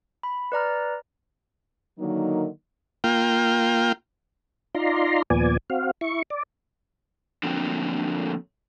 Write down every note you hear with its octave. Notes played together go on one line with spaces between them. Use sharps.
B5
B4 D5 A#5 F6
D3 D#3 F#3 A#3 D#4
A#3 F4 G5
D#4 F4 D5 A#5 C6
D#2 A#2 F3 B3 D5 G#5
C4 F#4 F5
E4 C#6
D5
D3 F3 F#3 A3 A#3 C4